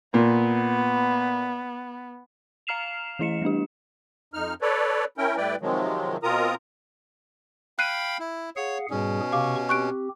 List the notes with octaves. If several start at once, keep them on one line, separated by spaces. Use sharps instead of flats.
A#2 B3
F5 A#5 F6 C7 E7 F7
E3 A3 E4 D#5 C#7 E7
G3 A3 D4 G4
F2 D#4 F6
A4 B4 C#5 D5
C#4 E4 A#4 G5
A2 G3 E4 B4 D5 G5
C3 D#3 F3 F#3 G#3
B2 C4 F4 A#4 A#5 D#6
F5 G5 B5 F#6 C7 D#7
E4
G#4 C#5 F5 F#5
G#2 B2 G3 C#4 G#4
C3 F5 C#6 D6
C4 G4 C#6 F#6 D7